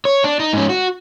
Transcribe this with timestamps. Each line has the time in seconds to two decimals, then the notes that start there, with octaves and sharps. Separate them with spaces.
0.05 C#5
0.24 D4
0.40 D#4
0.53 G#2 C#4
0.70 F#4